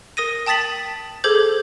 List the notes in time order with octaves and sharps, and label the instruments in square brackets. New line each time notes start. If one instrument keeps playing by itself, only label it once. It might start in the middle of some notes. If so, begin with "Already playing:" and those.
[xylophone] A#4 D#6 A#6 D#7
G5 A5 D#6 A6 B6 F#7
G#4 A4 C5 D6 G6 G#6